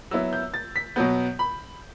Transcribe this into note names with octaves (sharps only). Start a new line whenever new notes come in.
F#3 B3 E4 E6
G6
A6
B6
B2 F#3 B3 G6
B5